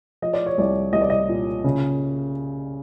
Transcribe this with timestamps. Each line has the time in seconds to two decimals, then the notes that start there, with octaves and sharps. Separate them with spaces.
0.22 F3 D#5
0.33 D5
0.46 C#5
0.58 C2 D5
0.93 C2 D#5
1.02 D5
1.10 D#5
1.29 A#2
1.64 C#3